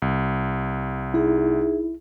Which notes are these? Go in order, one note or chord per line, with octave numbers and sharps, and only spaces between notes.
C2
D#4 E4 G#4 E5